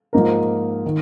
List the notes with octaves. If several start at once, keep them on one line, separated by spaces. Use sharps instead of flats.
G#2 F3 A#3 D#4 A#4
D#3